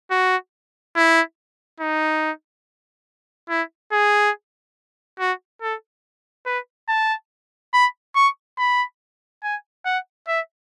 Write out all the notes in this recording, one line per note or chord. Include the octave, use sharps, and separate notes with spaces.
F#4
E4
D#4
E4
G#4
F#4
A4
B4
A5
B5
C#6
B5
G#5
F#5
E5